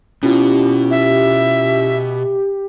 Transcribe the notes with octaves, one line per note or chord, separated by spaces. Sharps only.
B2 C#4 E4 F4 G4
E5